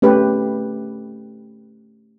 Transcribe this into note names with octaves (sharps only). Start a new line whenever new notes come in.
A3 C#4 G4 B4